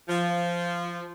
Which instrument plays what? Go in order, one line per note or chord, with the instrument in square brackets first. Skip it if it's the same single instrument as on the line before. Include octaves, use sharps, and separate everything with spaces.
[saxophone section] F3